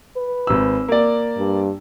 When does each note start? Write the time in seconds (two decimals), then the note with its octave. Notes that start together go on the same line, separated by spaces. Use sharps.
0.17 B4
0.47 G#1 E6
0.88 A#3 D5
1.38 G2